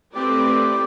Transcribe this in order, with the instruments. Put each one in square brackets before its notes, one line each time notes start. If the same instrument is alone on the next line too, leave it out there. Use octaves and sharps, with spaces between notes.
[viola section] A3 C4 E4 B4 D5 [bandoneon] G4